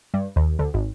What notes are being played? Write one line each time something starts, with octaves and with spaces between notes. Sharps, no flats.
G2
D#2
D2
G#1